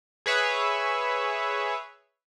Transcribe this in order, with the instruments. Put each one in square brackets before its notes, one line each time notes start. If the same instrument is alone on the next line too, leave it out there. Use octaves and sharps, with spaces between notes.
[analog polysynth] G#4 B4 C#5 E5